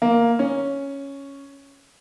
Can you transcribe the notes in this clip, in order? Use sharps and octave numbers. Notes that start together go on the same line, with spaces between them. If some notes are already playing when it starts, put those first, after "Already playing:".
A#3
C#4